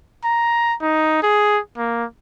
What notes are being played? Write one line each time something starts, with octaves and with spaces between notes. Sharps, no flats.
A#5
D#4
G#4
A#3